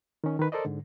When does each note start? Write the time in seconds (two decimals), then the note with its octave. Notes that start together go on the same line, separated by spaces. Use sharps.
0.24 D#3 C#4
0.39 D#3 B4
0.52 A4 A#4 C5 D5 D#5
0.65 G#2 D3